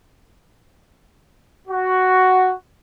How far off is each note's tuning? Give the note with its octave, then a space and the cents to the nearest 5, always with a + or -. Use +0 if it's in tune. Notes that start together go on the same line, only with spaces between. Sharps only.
F#4 +5